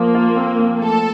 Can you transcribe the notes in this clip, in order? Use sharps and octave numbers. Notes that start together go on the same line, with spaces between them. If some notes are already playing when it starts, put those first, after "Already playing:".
Already playing: F3 A#3
F4
C4
F3
A3 A4